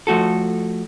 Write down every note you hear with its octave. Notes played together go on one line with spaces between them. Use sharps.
F3 A3 F#4 A4